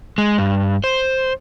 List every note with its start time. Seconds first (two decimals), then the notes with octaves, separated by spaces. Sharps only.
0.18 G#3
0.38 G2
0.84 C5